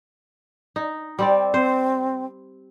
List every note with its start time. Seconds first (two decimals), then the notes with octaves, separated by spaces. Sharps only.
0.76 D#4
1.19 G3 C4 D5 G5
1.54 C4 C5